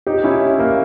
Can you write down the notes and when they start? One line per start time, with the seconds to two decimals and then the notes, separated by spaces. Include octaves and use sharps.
0.07 D#4 G4
0.24 C#4 E4
0.59 A#3